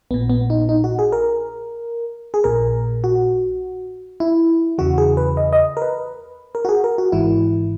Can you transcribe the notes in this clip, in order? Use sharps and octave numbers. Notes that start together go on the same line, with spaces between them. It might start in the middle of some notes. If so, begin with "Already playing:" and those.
A#1 A#2 B3
B3
D#4
D#4
F#4
G#4
A#4
G#4
A#1 A#2 A#4
F#4
E4
E2 C#3 E3 F#4
G#4
B4
D#5
D#5
A#4
B4
A#4
F#4
G#4
A#4
F#4
G#1 G#2 E3 E4